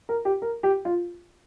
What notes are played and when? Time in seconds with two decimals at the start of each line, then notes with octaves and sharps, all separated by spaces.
0.09 A#4
0.25 G4
0.42 A#4
0.63 G4
0.85 F4